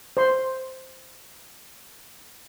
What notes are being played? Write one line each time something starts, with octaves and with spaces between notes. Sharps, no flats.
C5 C6